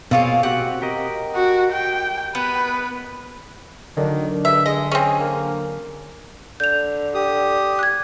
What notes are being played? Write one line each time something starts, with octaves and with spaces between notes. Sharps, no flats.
B2 A#3 C4 F4 G#4 C#5
C4 F#4 G4 F#5
G4 A#4 D#5
F#4
G5
B3 B4
D3 D#3 F#3 D4
G2 E5
G#3 D#5
C4 C#4 G#4
A#3
D3 G6 F7
G4 D#6
F#6 G#6